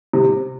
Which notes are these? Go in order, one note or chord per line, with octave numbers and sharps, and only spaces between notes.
C3